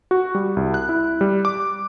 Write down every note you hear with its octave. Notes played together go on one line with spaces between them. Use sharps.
F#4
G3
C2
F#6
E4
G3
D6